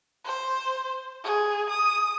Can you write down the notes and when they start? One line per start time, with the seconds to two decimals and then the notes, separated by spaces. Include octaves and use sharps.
0.24 C5
1.24 G#4
1.69 D#6